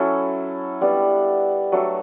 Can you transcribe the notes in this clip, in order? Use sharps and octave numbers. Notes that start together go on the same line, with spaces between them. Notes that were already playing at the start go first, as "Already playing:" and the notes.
Already playing: F#3 C#4 E4 A4
G3 B3 D4
F#3 A3 D4 A4